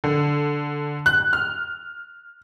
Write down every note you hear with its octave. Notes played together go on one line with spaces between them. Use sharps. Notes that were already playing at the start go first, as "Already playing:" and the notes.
D3
F#6
F6